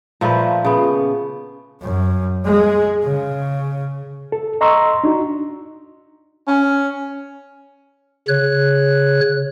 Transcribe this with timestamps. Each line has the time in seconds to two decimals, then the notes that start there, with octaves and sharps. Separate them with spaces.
0.21 A#2 F3 A3 B4
0.65 C#3 B3
1.81 F#2
2.46 G#3
3.03 C#3
4.32 A4
4.61 D#5 A#5 C6 C#6 E6
5.04 D4 D#4 F#4
6.48 C#4
8.28 C#3 C#5 F#6